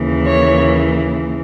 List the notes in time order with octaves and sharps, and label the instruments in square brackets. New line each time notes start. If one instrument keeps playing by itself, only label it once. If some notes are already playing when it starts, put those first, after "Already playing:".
Already playing: [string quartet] D#2 C#3 E3
C#5